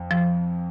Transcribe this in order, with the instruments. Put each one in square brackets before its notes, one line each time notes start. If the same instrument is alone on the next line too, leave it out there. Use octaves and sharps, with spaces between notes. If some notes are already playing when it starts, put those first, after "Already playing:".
Already playing: [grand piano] F2
[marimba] F3